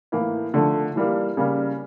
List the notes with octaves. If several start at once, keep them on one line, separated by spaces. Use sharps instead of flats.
A2 E3 A#3 E4
D3 F3 A3
E3 G3 A#3
C#3 G3 A#3